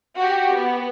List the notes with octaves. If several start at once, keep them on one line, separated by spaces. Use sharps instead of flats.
F#4 G4
B3